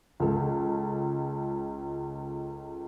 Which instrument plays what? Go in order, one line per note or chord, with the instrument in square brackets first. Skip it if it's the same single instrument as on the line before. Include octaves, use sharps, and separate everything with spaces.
[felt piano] C#2 A4